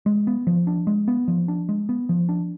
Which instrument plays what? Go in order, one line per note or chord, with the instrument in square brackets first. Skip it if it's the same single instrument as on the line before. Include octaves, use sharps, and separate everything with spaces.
[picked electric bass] G#3
B3
F3
D4
G#3
B3
F3
D4
G#3
B3
F3
D4